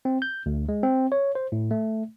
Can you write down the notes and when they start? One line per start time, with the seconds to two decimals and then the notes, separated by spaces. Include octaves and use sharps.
0.05 C4
0.22 G6
0.46 D2
0.69 G#3
0.83 C4
1.12 C#5
1.35 C5
1.52 A2
1.71 A3